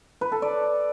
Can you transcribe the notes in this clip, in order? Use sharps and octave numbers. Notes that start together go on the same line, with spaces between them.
B4
A4
D5